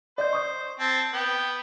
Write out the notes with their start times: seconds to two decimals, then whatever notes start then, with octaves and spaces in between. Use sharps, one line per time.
0.18 C5 D5 D#5 G6
0.33 C#6 D#6 G6
0.80 C4 A5
1.13 B3 G5